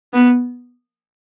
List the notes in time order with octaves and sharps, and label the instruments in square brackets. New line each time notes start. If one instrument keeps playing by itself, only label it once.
[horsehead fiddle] B3